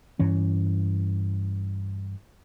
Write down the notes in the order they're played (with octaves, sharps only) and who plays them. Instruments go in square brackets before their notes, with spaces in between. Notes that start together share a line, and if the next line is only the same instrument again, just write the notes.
[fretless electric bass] G2 E3 C#4